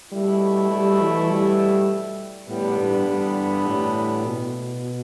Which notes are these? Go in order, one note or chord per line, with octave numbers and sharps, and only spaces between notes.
B2 G3 A3 E4
G3
E3
G3
E2 A2 D3 G3 B3
G2
G2
A2
B2